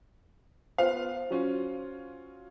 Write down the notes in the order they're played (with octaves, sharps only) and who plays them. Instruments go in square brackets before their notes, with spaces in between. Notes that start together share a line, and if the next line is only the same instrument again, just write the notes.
[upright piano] B3 F4 F5 [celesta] C5
[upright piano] F#3 C#4 F4